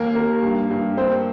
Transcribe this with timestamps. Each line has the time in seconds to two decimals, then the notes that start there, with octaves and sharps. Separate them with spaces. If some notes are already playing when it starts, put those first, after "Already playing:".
Already playing: D#2 A#3 A#4
0.15 A#3
0.43 G2
0.70 G2
0.97 A#3 C4 C5